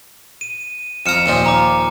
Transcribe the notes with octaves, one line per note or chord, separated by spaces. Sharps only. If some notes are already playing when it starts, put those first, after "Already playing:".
D#7
F2 A#5 F6 C#7 E7
D#2 A#2 F3
A#5 D6